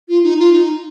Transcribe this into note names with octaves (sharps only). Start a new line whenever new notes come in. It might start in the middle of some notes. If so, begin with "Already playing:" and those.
F4
D#4
F4
D#4